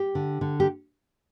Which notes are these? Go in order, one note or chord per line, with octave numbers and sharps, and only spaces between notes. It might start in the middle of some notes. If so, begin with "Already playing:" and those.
Already playing: G4
D3
D3
G4